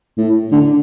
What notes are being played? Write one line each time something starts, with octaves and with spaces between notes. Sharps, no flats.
A2
D3